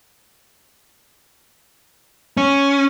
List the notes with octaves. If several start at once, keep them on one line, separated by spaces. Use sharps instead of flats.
C#4